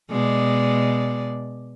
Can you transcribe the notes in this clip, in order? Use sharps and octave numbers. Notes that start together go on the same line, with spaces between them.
B2 G#3 D5